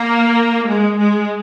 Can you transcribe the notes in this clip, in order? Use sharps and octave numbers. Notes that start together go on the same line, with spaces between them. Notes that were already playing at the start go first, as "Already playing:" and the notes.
Already playing: A#3
G#3
G#3